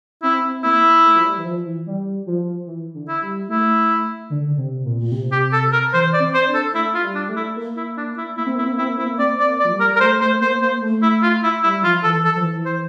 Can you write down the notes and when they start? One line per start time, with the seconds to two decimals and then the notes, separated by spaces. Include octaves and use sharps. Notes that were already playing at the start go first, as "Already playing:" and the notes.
0.23 C4 E4
0.64 A#3 E4
1.04 A3
1.15 F3
1.24 G3
1.38 E3
1.45 F3
1.66 E3
1.87 G3
2.26 F3
2.67 E3
2.94 D3
3.08 E4
3.22 G3
3.49 A3 E4
4.30 D3
4.46 D3
4.58 C3
4.85 A#2
5.01 A#2
5.12 C3
5.32 G4
5.52 A4
5.72 A#4
5.93 E3 C5
6.13 D5
6.20 C4
6.34 C5
6.48 D4
6.54 A4
6.75 A3 E4
6.94 F4
7.02 G3
7.15 D4
7.23 G3
7.29 A3
7.36 E4
7.56 A#3
7.77 E4
7.97 D4
8.17 E4
8.37 A#3 E4
8.47 C4
8.55 A#3 E4
8.62 C4
8.72 A#3
8.78 C4 E4
8.88 A#3
8.97 C4 E4
9.05 A#3
9.19 C4 D5
9.40 D5
9.46 A#3
9.60 D5
9.65 F3
9.73 G3
9.80 A#4
9.94 G3 A#4
10.00 A3 C5
10.21 A3 C5
10.41 A#3 C5
10.61 A#3 C5
10.81 A3
11.02 E4
11.22 F4
11.43 E4
11.63 G3 E4
11.74 G3
11.84 F3 F4
12.04 E3 A4
12.25 E3 A4
12.36 F3
12.44 E3
12.65 C5